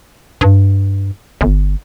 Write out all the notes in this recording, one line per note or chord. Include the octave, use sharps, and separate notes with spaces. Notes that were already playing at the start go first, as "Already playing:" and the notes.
G2
G1